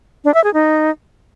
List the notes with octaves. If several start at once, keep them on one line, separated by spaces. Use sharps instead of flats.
D4
E5
G#4
D#4